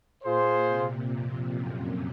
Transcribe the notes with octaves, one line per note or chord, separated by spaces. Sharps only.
A#2 F4 G#4 C5
C3
F2
F#2